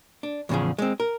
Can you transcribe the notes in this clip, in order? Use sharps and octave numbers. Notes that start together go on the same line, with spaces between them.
D4
E2 A2 C#3 F3 G#4
G#3 C4
A#4